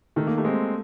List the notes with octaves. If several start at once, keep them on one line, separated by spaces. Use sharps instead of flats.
D#3 A3
A#3
G3 A3
G#3 C4